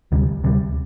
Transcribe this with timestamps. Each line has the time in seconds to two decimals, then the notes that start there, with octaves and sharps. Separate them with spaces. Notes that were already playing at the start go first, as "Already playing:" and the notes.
0.12 D2 C3 G3
0.44 D2 C3 G3